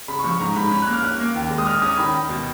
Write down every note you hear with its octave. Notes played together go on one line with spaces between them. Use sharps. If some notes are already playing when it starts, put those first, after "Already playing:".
C#3 B5
C#6
F3
C#6
G#2 A#5
G#2 B5
C#4 B5
F#6
A#3
F6
C#4 F#6
A#3
D#2
G#3
D#6
A#2 F6
C#4 D#6
D#3 B5
D#3
B2